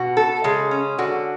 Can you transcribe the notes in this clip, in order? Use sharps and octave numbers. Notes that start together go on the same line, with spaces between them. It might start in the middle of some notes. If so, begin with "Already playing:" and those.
Already playing: B2 F#4
A4
C#3 G#3
C#4
D3 F#4